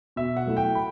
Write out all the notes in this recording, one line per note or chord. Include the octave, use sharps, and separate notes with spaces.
B2 E5
F#5
F#3 A3 E4
G5
B5